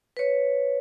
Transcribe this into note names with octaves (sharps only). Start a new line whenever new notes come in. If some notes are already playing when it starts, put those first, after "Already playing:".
B4 C#5